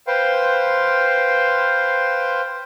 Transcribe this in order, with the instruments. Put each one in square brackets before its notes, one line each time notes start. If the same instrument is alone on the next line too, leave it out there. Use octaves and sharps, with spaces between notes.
[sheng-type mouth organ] B4 C5 F5 G5 C6